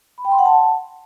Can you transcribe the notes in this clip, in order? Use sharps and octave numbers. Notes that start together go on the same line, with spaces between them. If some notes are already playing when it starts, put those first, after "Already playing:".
B5
G5
C6
F#5
A5